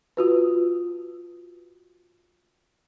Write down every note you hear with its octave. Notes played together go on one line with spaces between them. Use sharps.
F4 F#4 B4